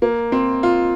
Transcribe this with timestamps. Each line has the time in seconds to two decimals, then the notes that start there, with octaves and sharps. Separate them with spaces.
0.02 A#3
0.32 C4
0.63 F4